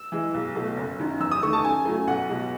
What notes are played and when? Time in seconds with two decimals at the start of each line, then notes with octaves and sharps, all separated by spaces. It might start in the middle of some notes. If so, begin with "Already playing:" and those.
Already playing: E6
0.12 E3 G#3
0.34 B1
0.55 B2 A3
0.77 F#1
0.99 F#2 D#3
1.20 E2 E6
1.31 D#6
1.43 D#3 A3 C#6
1.53 A5
1.64 F#2 G#5
1.85 C#3 F#3 A3
2.07 B1 F#5
2.29 B2 G#3